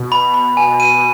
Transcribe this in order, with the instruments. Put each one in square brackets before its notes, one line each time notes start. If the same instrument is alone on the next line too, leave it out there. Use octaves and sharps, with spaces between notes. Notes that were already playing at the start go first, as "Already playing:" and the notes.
Already playing: [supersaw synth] B2
[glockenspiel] B5
B5
[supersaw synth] B2 [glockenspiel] G#5
[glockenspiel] D#7